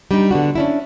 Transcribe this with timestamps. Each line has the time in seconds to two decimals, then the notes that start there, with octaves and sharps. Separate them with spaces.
0.11 G3 D4 D#4
0.31 D3 B3 D4 F#4
0.55 C#4 D4 E4